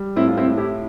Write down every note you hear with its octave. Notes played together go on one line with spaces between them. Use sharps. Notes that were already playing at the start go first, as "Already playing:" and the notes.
Already playing: G3
A2 C4 E4
F4
C4 E4
A2
E4 G4